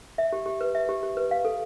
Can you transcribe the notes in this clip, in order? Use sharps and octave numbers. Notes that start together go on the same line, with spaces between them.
E5
G4
G4
B4
E5
G4
G4
B4
F5
A4